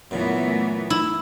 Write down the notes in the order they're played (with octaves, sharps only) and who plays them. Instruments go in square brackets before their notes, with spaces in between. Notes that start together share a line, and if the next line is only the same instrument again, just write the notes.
[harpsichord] F#2 A#2 [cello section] E3 A3 B3
[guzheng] E4